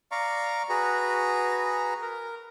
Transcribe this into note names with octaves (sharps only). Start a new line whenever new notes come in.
D5 F5 A#5 C#6
F#4 G#4 B4 A#5
A#4